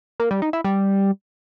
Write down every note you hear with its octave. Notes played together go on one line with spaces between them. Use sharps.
A#3
G3
D#4
E4
G3